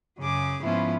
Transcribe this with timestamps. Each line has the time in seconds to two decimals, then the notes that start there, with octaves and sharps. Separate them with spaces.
0.19 F#2 C#3 G#4 D6
0.62 G#2 F3 B3 C#4 E4 F4